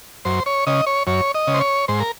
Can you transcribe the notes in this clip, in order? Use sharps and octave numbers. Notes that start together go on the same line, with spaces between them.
F#2 C5
C#5
C#3 D#5
C#5
F#2 C#5
D#5
C#3
C5
C#5
G#2 C5
A#4